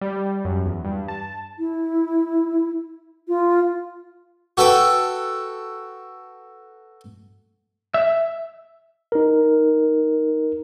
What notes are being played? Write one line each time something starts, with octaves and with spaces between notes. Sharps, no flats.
G3
F#2
E2
G2
A5
E4
F4
F#4 A4 B4 G5
E5
D#4 A#4